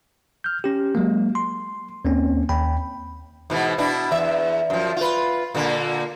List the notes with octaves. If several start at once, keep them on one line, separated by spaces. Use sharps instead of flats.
F6 G6
C#4 G4
F#3 G#3 A#3
C6
D#2 A#3 C4 C#4
D#2 G5 B5
G#2 B2 E3
B2 D4 E4
E2 E5
F#2 F3
F4 B4
A#2 D3 A#3